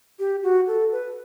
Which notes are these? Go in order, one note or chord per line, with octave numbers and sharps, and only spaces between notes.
G4
F#4
A4
B4